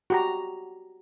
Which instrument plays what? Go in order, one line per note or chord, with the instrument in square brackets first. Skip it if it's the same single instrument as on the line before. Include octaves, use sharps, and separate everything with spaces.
[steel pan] F#4 G4 A#5